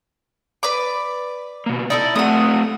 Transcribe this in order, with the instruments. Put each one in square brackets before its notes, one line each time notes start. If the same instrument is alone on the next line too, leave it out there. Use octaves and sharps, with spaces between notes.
[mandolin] B4 D5 D6
[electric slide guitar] B2 A#3
[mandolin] D#4 E4 A4 [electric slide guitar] D5
[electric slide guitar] A3 C4 A4 [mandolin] F#5 D#6